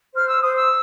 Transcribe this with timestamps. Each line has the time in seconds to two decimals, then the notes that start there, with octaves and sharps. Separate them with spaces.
0.13 C5 F6
0.27 E6
0.40 C5 D#6
0.53 E6